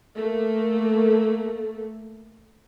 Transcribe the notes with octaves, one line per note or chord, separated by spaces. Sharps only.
A3 A#3